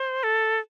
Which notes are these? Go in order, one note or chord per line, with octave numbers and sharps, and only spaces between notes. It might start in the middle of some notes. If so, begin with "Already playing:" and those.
Already playing: C5
A4